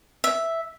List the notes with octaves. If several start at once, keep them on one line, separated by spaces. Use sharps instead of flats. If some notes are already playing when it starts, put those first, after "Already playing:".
E5